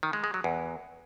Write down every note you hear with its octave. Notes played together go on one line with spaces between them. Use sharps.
D#3
G#3
G#3
F#3
E2